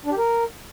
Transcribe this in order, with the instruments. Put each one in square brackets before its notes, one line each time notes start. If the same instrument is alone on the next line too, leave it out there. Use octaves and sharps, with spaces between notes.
[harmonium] D4
G4
A#4